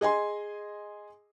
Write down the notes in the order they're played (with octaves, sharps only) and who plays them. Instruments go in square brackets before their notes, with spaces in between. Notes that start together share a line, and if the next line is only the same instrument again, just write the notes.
[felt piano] G#4 D#5 G#5 C6